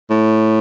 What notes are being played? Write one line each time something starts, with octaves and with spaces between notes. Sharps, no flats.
A2